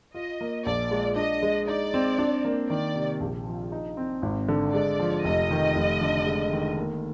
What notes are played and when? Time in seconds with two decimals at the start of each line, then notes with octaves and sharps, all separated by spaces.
0.14 F4 D#5
0.41 A#3
0.66 A#1 D5
0.91 G#3
1.16 D4 D#5
1.42 G#3
1.67 D#4 D5
1.94 C4
2.18 D4
2.45 A#3
2.70 D#3 D5
2.95 C3
3.20 A#1
3.46 F3
3.72 D#4
3.97 C4
4.22 G#1
4.48 D3
4.74 G#3 D5
4.99 F3
5.24 F1 D#5
5.51 D#3
5.75 F1
6.01 D3
6.27 G#3
6.52 D#3
6.78 A#3